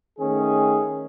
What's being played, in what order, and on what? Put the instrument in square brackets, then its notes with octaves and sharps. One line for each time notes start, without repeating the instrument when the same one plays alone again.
[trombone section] D#3 A3 C#4 G#4